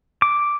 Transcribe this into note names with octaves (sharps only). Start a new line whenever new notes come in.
D6